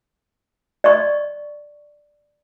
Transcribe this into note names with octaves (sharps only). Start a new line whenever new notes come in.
D5 D#5 C#6